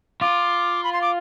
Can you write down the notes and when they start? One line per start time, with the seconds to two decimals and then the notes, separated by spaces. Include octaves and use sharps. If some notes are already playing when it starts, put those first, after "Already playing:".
0.21 F4 D6
0.84 B5
0.93 C6
1.02 D6